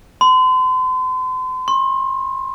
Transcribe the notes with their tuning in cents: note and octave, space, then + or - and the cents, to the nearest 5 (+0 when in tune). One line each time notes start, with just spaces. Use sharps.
C6 -40
C6 +40